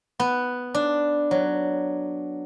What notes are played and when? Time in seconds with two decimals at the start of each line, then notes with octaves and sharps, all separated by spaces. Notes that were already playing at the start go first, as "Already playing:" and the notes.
0.20 B3
0.74 D4
1.31 F#3